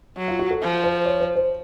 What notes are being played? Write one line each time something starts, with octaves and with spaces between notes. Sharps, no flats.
F#3
F4
F#4
A4
F3
C5
C#5
C5
C5